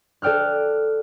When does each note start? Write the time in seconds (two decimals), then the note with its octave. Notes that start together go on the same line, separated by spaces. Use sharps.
0.22 A4 D5 G5 F6 F#6